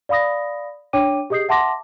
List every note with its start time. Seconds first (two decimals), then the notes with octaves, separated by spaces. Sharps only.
0.09 D5 F5 B5 D#6 A#6
0.93 D4 C#5 G5 D6 D#7
1.30 G4 G#4 D#5 D#6 G6 C7
1.49 E5 F#5 A5 C6 D6 A#6